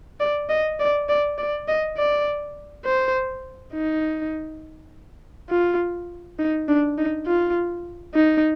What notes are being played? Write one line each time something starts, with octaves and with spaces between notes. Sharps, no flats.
D5
D#5
D5
D5
D5
D#5
D5
C5
D#4
F4
D#4
D4
D#4
F4
D#4